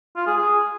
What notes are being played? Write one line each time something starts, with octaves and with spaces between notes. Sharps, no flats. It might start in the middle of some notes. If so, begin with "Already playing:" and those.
F4
G#4
G#4